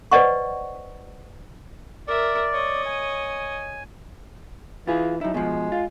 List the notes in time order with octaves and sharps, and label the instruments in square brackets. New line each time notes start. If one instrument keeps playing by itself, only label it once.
[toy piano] B4 C5 D5 D#5 F#5 C#6
[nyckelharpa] A#4 E5 [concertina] D5
[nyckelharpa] C#5 D#5
[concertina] G#5
[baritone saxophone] E3 [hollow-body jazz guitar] F4 G#4
[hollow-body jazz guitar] F#2 E4 [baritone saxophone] D#4
[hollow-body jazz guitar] B2 F3 [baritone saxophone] G#3
[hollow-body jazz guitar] F4